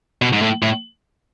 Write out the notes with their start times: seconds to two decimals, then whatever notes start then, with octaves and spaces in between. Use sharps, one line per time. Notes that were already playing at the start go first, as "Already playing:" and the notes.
0.22 B2
0.33 G#2
0.42 A2
0.62 A2